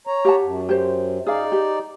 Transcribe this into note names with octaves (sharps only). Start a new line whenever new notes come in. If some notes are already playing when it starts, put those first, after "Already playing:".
C#5 A#5
G4 F#5 A5
F#2
G4 C5
D#4 G#4 D5 F5
G4